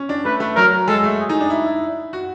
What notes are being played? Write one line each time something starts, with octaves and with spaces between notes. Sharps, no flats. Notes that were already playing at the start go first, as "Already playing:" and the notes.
Already playing: C#4
D4
A3 B4
A3
F#3 A#4
G#3 A4
A3
G#4
D#4
D4
E4
E4
F#4